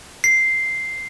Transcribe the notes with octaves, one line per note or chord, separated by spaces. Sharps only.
C7